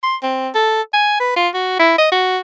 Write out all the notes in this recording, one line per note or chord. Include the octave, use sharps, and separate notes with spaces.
C6
C4
A4
G#5
B4
F4
F#4
E4
D#5
F#4